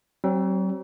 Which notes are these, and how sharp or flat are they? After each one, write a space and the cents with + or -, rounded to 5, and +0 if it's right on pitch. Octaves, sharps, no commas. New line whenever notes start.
F#3 +45 C4 +20